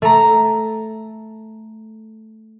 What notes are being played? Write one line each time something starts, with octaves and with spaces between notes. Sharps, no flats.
A3 A#5